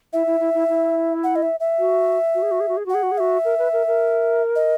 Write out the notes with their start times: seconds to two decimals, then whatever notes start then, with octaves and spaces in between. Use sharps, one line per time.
0.13 E4 E5
0.27 E4
0.40 E4
0.54 E4
0.69 E4
1.24 F#5
1.36 D#5
1.42 E5
1.60 E5
1.79 F#4
2.35 F#4
2.42 G#4
2.51 F#4
2.60 G#4
2.69 F#4
2.77 G#4
2.86 F#4
2.90 G#4 F#5
3.03 F#4
3.11 G#4
3.18 F#4 E5
3.45 A#4
3.59 B4
3.73 A#4
3.87 A#4
4.56 D#5